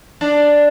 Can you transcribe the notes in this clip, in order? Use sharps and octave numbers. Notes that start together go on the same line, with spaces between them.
D4